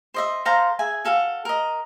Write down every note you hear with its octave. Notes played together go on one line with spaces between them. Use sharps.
C5 D#5 E5
A4 C5 F5 A#5
G#4 E5 G#5
F#4 A4 F5
A#4 D#5